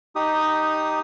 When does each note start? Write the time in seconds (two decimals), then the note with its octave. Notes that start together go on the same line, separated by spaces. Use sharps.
0.16 D#4 G4 D#6